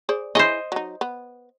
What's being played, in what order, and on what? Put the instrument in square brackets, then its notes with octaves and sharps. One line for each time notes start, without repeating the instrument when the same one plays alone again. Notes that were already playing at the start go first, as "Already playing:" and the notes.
[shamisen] G#4 C5 D5
[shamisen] E4 G#4 C#5 [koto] C5 D#5
[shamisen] F#3 D#4
B3